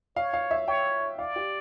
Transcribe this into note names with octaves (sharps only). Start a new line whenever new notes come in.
C#5 F5
F5
E5
C#5 G5
D5 F5
G4